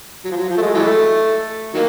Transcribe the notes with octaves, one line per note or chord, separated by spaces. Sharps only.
F#3
F3
F#3
F3
A3
G#3
E3 F#3 A3
D#3 F#3 A#3